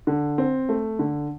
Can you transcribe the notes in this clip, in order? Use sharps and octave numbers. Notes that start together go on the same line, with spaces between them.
D3
C4
A3
D3